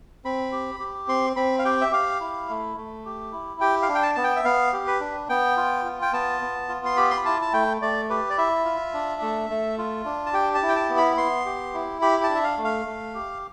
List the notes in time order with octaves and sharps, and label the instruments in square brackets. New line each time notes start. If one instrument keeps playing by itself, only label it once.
[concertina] C4 B5
G4
G4
C4 C6
C4 B5
F5
G4 G5
E5
G4 F5
E4
A3
A3
G4
E4
G4 G5
F5
D4
G5
A5
B3 A5
G5
E5
B3 F5
G4
B4
D4
B3 G5
F4
F4
G5
B3 A5
B3
F4
C6
G4 B5
C6
B5
E4 A5
A5
A3 G5
A3 D5
G4 B4
D5
E4 E5
F4
D4
A3
A3
F4
D4
A5
G4 G5
A5
E4
G5
A5
B3
B5
B3 C6
G4
E4
G4 B5
A5
D4
E5
F5
A3
F5
A3
G4